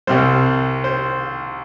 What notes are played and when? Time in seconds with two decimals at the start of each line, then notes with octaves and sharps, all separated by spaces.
0.07 C2 C3 G3 C5
0.84 C5